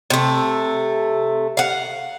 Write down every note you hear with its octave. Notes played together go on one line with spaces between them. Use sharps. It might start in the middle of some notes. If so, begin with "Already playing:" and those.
C3 A3
F5 F#5